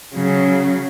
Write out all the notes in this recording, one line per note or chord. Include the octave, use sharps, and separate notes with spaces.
C#3 F#3